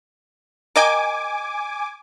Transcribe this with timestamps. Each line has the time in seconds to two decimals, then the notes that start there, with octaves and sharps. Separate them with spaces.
0.76 A#4 D#5 G5 G#5 D6